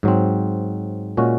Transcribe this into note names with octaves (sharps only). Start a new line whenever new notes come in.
G#2 F#3 C4
A#2 G#3 C#4 F#4